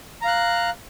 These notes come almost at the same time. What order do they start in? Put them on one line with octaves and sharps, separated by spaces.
A#5 F5 F#6